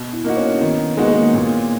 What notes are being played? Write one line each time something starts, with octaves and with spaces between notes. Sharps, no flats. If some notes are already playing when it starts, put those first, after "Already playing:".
Already playing: B2
E4
A#3 D#4 F#4
C#4
D#3 B3
G#3 A#3 D#4 F#4
B3
A#3
A#2